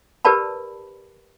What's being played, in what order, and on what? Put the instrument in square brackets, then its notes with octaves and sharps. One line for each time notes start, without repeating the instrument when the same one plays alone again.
[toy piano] G4 A#4 B4 D5 A5 B5